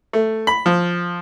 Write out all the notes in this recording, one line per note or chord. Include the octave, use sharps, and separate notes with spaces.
A3
B5
F3